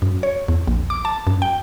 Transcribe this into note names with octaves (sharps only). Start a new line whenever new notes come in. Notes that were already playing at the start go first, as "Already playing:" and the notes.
F#2
C#5
E2
A#1
D6
A5
F#2
G5